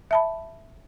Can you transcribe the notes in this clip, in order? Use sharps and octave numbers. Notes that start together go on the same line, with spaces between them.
E5 A5 B5